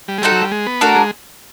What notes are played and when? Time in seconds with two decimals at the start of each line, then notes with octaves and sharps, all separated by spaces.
0.08 G3
0.18 G#3
0.22 G3 C4 D#4 F#4 A4
0.32 F#3
0.42 G3
0.51 G#3
0.67 B3
0.81 A3 D4 F#4 A#4
0.96 G#3